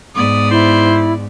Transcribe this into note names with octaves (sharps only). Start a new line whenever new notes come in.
G#2 B3 D5 D#6
E4 C5